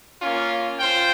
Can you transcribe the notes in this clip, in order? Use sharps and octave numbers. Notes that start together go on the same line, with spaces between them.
A#3 C#4 F4
F4 C5 G5